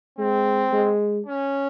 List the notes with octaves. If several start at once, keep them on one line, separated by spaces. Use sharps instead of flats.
G#3 C4
G#3
C#4